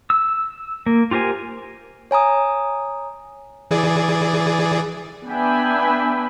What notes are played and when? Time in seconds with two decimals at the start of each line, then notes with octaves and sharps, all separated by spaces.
0.10 E6
0.86 A#3
1.11 F4 G4 A#4 C5 G#5
2.11 C#5 G#5 A#5 D#6
3.71 E3 G#4 D5
5.28 B3 D4 E5 G5 G#5 B5